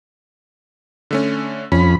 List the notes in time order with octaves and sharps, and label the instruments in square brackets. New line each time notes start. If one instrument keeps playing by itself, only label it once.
[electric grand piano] D3 A3 C#4
[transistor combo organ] F2 B5 [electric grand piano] C#4